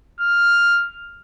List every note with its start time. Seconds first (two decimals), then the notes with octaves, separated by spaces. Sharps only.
0.21 F6